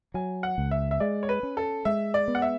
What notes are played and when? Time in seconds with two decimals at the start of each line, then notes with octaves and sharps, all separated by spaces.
0.14 F#3 G#5
0.43 F#5
0.58 C#2
0.71 E5
0.91 E5
1.00 G#3 D5
1.23 C#5
1.29 B4
1.43 C#4
1.57 A4
1.85 G#3 E5
2.14 D5
2.28 B3
2.35 F#5
2.42 E5